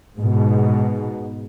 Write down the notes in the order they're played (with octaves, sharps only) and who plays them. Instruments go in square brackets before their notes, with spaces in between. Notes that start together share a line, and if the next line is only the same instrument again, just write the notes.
[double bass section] G#2 B2